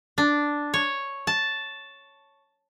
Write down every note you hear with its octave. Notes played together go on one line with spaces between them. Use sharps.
D4
C#5
A5